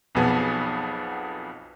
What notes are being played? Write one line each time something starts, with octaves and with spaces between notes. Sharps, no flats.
B1 F2 B2 B3 G#4 A5